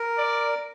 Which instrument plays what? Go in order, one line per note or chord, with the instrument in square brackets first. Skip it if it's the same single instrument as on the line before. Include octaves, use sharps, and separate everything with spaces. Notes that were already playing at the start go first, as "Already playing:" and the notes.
Already playing: [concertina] A#4
[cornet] D5